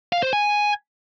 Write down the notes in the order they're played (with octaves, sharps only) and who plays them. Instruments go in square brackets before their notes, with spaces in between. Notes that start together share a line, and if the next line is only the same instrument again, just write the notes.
[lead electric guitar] F5
C5
G#5